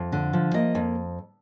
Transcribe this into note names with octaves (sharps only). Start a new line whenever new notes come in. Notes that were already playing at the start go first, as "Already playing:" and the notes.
Already playing: F2
D3
F3
A#3 D#5
F2